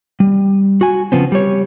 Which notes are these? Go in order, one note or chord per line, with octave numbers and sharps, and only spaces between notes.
G3
F#4 G#5
C#3 F3 B3 C4
G3 C#5